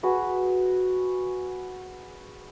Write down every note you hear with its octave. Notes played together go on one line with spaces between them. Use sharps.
F#4 G#4 B4